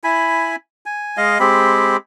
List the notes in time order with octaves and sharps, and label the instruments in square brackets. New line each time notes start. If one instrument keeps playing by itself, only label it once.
[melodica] E4 G#5 B5
G#5
G#3 D#5 F5
G#3 C4 G4 B5